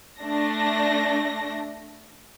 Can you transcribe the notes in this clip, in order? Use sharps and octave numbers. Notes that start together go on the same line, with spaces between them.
A3 D4 A#6